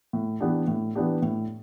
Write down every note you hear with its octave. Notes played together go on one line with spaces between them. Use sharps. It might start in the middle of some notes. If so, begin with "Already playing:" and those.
A2
E3 B3 D4 G4
A2
E3 B3 D4 G4
A2